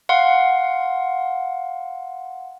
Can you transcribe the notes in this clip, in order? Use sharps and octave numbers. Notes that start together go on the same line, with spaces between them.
F5 F#5 C6